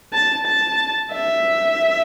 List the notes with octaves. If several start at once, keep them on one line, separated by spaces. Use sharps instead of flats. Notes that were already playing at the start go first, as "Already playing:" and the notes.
A5
A5
E5